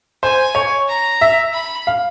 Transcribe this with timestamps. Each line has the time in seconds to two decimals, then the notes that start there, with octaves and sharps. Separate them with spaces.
0.23 C5 G#5
0.55 C#5
0.88 A#5
1.21 E5
1.54 B5
1.87 F5